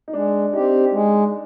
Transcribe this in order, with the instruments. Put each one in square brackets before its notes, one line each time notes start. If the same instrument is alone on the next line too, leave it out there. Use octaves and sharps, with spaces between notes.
[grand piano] D#4
[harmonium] G#3 [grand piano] D4
[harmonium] C4 G4 [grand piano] D#4
[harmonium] G#3